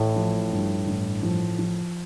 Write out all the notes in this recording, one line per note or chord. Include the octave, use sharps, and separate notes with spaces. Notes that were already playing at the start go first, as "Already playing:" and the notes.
Already playing: A1 A2
F3
G2
A1
F3
F3